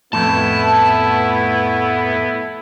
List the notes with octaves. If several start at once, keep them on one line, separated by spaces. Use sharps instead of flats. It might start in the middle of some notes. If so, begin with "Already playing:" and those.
F2 A2 A3 B3 E4 A5